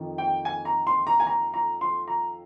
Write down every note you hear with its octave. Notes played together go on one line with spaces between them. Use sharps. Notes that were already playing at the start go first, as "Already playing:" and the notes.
Already playing: F2 D#3
G5
G#5
A#5
C6
A#5
G#5
A#5
A#5
C6
A#5